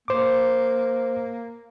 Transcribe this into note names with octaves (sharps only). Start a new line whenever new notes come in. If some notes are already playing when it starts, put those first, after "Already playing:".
A#3 C5 D6